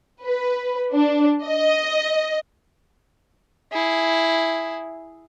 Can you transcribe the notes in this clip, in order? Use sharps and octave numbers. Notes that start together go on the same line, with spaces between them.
B4
D4
D#5
E4 G#4